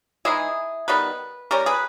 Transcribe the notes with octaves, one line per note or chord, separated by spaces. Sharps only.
E3 G#3 D#4 E4 G#4
D#3 G3 B3 B4
G3 C#4 G4 A#4
G#4 B4